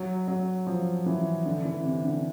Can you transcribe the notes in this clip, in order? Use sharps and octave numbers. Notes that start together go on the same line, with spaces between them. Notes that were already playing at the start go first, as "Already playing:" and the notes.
Already playing: F#3
F#3
F3
E3
D3
E3
C3
D3